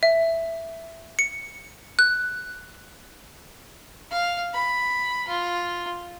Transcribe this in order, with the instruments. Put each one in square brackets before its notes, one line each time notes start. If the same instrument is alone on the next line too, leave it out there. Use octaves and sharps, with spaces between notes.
[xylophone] E5
C#7
F#6
[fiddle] F5
B5
F4